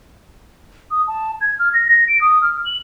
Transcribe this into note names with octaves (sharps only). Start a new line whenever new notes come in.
D#6
A5
G#6
F6
A#6
A#6
D7
D#6
F6
F#7